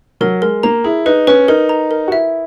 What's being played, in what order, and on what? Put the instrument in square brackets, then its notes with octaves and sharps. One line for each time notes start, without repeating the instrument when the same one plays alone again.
[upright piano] F#3 [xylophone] A#4
[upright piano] G#3 [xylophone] A#4
[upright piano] A#3 [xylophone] A#5
[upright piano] E4 [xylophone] G#4
[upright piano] D#4 [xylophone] B4
[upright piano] C#4 [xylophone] B4
[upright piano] D#4 [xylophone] A#4
[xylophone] A#5
A#4
[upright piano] F#4
[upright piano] E4 [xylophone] E5